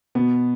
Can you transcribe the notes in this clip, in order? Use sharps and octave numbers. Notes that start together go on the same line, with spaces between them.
B2 B3